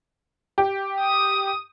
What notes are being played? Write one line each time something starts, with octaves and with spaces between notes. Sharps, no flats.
G4
D#6